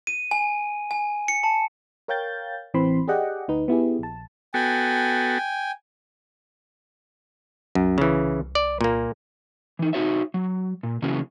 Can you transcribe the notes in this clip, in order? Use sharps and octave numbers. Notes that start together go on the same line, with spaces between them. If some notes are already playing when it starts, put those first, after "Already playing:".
D#7
G#5
G#5
C#7
A5
A#4 C#5 F5 G5 G6 A6
A1 E3 C4 B5 C6
G4 G#4 D5 D#5 F#5 G5
D2 D#4 B4
B3 E4 G4 G#4
A#1 A5
B3 F#4 A4 G5 G#5
C2 F#2
C#3 E3
D5
A#2 A#3
E3 D#4
D#4 F#4 C#5 E5
F#3
A#2
C#3 E3 F#3 A#3 C#4